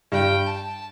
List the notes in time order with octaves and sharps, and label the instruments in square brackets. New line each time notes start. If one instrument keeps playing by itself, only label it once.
[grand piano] G2 [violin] G5
[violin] A5